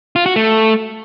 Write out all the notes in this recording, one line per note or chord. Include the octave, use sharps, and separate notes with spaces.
F4
F#4
A3